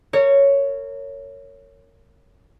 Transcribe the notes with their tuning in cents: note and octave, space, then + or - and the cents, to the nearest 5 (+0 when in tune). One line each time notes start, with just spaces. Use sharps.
A#4 -30 C#5 +5